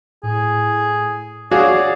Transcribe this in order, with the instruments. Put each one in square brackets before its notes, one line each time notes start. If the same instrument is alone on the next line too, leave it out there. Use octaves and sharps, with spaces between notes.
[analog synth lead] A2 [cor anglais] G#4
[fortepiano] F#4 G#4 F5 [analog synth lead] C#5 [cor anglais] D5